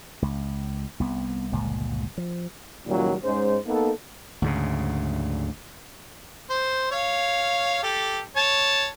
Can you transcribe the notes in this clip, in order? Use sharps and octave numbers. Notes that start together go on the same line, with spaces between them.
C#2
C2 B3
G1 C#2 A#2 G#3
F3
C#2 A#2 D#3 F#3 G3 C#4
G#2 G#3 C#4 C5
A#3 B3 D#4 A4
D2 G#2 C#3
C5
C#5 F5
G4 A4
C#5 A5